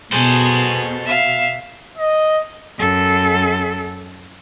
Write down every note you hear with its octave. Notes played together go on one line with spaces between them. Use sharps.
B2 G#4 A4 C5
E5 F5
D#5
F#2 A4